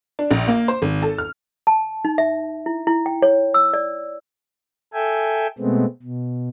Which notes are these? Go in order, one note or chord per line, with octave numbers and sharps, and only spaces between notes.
D4
A#1
A#3
C5
G#1
A4
F6
A5
D#4
E5
E4
E4
G5
C#5
E6
D5
A4 E5 G5 G#5
B2 G#3 A3 B3 C4
B2